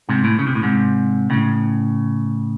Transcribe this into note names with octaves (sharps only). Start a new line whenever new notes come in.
G#2 C3
A2
C#3
C3
A2
G#2 C3
A2 C#3